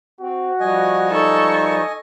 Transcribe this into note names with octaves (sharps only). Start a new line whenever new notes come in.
C4 F#4
F3 G3 D#5 G#5
D#4 A4 C#6